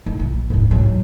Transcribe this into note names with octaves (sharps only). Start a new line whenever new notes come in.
D#3
A#1
D1 G#2
G#2 F#3